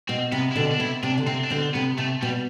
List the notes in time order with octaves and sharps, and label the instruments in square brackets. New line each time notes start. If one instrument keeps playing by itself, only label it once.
[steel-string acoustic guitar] B2 [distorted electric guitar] C4
[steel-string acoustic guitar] C3 [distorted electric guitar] B3
[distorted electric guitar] E4
[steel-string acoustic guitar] B2 D3 [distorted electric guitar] D4
[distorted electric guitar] D4
[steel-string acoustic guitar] C3 [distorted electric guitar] E4
[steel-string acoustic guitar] C3 [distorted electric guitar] D4
[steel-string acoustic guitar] D3
[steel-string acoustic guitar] C3 [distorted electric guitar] C4
[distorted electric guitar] D4
[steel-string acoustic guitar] B2 D3 [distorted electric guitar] C4
[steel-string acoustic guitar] C3 [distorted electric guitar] B3
[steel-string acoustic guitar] C3 [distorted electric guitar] A3
[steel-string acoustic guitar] B2 [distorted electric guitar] G3